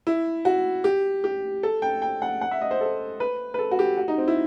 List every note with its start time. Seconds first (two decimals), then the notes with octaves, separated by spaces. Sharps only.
0.07 E4
0.45 F#4
0.84 G4
1.24 G4
1.63 A4
1.82 G5
2.02 G5
2.22 F#5
2.41 F#5
2.51 E5
2.61 D#5
2.71 C5
2.81 A4
3.20 B4
3.54 B4
3.59 A4
3.71 F#4
3.79 G4
3.97 F#4
4.08 D#4
4.18 C4
4.28 E4